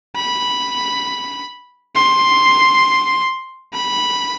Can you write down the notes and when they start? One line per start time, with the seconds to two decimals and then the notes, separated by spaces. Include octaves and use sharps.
0.17 B5
1.96 C6
3.74 B5